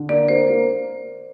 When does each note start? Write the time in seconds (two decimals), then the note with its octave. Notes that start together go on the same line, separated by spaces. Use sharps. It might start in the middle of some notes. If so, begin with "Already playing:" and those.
Already playing: D3
0.09 A#3 D5
0.28 A#3 C5
0.49 A#3